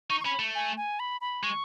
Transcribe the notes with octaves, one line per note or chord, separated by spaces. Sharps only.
D#4 C#6
C#6
C#4 B5
A3
G#5
G#5
B5
B5
G#3 C#6